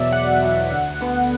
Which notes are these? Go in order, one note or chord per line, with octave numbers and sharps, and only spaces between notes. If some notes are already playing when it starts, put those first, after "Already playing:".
Already playing: E2 B2 F#3 D5 E5
E2 F#5
B2 F#3
D2
D3 B3